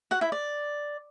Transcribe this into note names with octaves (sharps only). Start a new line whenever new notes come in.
F#4 F#5
E4 E5
D5